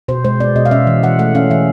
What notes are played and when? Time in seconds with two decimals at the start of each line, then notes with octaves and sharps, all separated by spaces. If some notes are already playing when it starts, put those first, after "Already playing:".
0.08 B2 C5
0.24 G#3 C5
0.40 B3 D5
0.56 B2 D#5
0.66 F5
0.71 C#4 E5
0.87 E3
1.03 E3 F#5
1.19 A3 F#5
1.35 C#4 F5
1.50 E3 E5